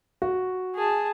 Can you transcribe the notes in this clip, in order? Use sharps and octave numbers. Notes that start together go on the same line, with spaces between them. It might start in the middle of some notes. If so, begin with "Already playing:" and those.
F#4
G#4 A5